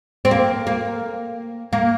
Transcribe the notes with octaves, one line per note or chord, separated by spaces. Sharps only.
C4
A#3
A#3
A#3